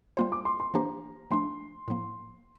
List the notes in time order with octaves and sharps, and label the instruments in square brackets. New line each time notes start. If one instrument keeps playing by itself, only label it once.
[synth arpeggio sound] G3 A#3 F4 C5 [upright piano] C6
[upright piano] D6
C6
C6
[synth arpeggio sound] E3 A#3 D4 G4 C5 [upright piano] A#5
[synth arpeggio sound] F3 A3 D4 [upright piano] C6
[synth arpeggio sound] A2 F3 A#3